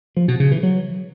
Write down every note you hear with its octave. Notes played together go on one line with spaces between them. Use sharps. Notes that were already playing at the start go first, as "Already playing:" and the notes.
F3
B2
C#3
E3
F#3